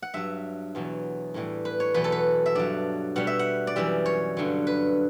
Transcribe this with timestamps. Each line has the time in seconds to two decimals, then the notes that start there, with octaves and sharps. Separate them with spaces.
0.02 F#5
0.14 G2 F#3 E5
0.75 E2 B2 F#3
1.34 A2 E3 G3
1.65 B4
1.80 C#5
1.94 E2 B2 F#3 B4
2.04 A4
2.12 B4
2.46 E5
2.55 G2 F#3 D5
3.16 B2 G3 F#5
3.27 E5
3.39 F#5
3.67 D5
3.76 F#2 E3 G3 E5
4.06 C#5
4.37 G2 D3 F#3
4.67 B4